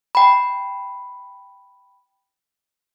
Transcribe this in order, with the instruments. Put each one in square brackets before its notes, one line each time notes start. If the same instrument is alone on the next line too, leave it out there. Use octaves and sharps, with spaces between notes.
[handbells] G5 B5